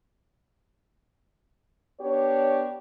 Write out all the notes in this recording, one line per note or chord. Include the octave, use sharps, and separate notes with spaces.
B3 D4 G4 C#5